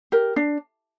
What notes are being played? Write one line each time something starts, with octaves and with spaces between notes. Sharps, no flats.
G4 A#4
D4